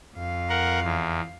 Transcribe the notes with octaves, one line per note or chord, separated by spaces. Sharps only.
F2 F5
A#4 F#5
E2